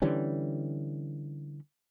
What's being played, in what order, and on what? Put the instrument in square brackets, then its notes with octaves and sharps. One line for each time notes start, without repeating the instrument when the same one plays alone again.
[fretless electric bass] D3 E3 G3 C#4